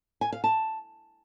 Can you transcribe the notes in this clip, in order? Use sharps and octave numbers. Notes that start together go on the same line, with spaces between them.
G#5
F5
A5